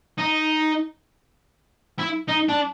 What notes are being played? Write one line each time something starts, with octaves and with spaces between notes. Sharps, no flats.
D#4
E4
D#4
D4